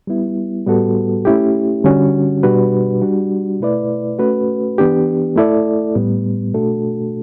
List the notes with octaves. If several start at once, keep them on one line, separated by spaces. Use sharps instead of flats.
G3 B3 E4
A2 G3 B3 F#4 A4
A3 C#4 E4 G4
D3 G3 C#4 F#4
B2 G3 D4 F#4 B4
G3 D4 F#4
B2 A3 E4 B4 D5
A3 C#4 F#4 B4
E3 B3 D4 G4
A3 E4 A4 D5
A2 G3 B3
B2 A3 D4 F#4 A4